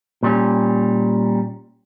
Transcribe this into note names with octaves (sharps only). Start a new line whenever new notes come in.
A#2 G3 C#4